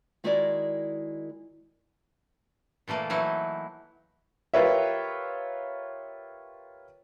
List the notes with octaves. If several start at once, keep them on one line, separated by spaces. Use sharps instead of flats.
D#3 G#3 E4 F#4 A#4 D5
A#2 E3 A3 A#3
E3 F#3 D#4 E4
F4 G4 A#4 B4 C#5 E5